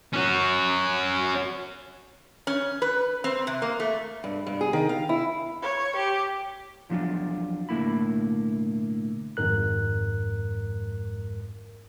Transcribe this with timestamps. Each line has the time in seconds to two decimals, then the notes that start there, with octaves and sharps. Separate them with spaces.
0.13 C#4 F#4
2.47 C#4
2.82 B4
3.24 C4
3.47 C3
3.62 A#3
3.80 A3
4.24 G2
4.47 G2
4.61 G#4
4.73 D#3
4.89 F5
5.09 E4
5.62 C#5
5.96 G4
6.89 E2 F3 F#3 D4 F4
7.69 B1 A2 D3 A#3 E4 B5
9.37 G#1 F2 G#2 A#4 F#6